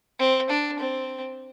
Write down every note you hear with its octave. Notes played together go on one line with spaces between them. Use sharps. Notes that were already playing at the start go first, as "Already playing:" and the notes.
C4
D4
C4